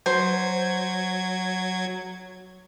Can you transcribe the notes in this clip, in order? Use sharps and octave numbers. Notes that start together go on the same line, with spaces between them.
F#3 C5 G#6